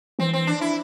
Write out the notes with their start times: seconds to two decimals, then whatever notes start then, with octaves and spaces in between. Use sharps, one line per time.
0.19 E3 C4
0.33 C4
0.47 D4
0.61 E4